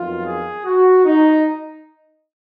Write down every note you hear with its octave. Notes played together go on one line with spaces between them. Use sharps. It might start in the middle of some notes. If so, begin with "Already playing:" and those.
Already playing: F2 D#3 F#3 B3 F4
G#4
F#4
D#4